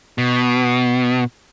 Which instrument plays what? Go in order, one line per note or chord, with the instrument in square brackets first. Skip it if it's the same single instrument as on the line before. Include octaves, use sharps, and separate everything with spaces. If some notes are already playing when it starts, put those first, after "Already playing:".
[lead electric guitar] B2